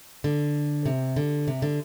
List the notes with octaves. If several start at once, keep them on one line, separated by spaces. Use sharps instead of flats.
D3
C3
D3
C3
D3